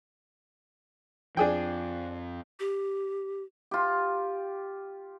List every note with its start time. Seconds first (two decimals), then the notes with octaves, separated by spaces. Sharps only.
1.37 F2 F3 D4 G#4 G5
2.60 G4
3.71 F4 G4